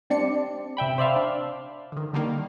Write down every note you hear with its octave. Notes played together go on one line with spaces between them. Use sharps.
G3 C4 D4 D5 C#7
C3 E5 G5 B5
C5 D5 E5 F5
D4
D3 D#3
D3 D#3 G3 A#3